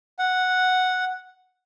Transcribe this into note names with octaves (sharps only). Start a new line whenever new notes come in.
F#5